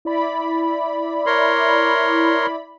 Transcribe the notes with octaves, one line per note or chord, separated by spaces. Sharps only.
E4 D5 B5
A#4 C#5 C6